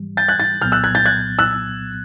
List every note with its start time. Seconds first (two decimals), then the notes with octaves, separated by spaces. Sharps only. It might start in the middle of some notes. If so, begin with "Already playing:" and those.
Already playing: G#2 E3 G3
0.17 G6 A6
0.28 F#6 G#6
0.40 G6 A6
0.61 C2 A#2 F#3 B3 F6 G6
0.72 E6 F#6
0.84 F#6 G#6
0.95 G6 A6
1.06 F#6 G#6
1.39 E6 F#6